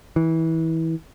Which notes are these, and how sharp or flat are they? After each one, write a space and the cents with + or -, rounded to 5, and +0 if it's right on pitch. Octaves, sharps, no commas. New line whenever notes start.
E3 -25